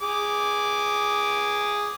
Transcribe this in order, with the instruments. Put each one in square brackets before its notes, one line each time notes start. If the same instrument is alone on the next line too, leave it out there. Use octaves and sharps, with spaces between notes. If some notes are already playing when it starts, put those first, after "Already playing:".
[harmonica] G#4 D6